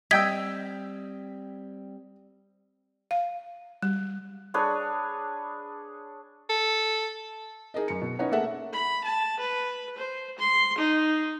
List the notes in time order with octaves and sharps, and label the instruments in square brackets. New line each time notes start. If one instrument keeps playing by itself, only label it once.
[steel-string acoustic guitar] G3 C4 [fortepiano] D#5 G5 E6 [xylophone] G#6 B6
[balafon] F5
G3
[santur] D4 G#4 B4 C#5
[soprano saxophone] A4
[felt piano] D#4 G#4 A#4 D#5
F#2 A#4 C#7
B2
C#4 D#4 B4 C#5 F#5
A3 A#3 G#4 A4 E5 F#5
[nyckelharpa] B5
A5
B4
C5
C6
D#4